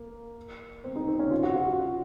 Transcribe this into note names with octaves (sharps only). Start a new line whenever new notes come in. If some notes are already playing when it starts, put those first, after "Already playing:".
Already playing: A#3
C4
D#4
C4
C#4
F4
F#4
F4
F#4